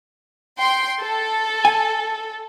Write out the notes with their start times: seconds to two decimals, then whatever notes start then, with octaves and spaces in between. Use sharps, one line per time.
0.59 G5 C6
1.03 A4
1.65 G#5